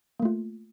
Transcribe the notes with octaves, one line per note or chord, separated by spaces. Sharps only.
A3 A#3 F4